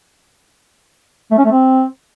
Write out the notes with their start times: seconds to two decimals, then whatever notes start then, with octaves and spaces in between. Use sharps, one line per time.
1.31 A3
1.38 C#4
1.45 A3
1.52 C4